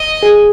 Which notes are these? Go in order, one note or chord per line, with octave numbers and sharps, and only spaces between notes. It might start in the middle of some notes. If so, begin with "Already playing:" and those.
Already playing: D#5
G#4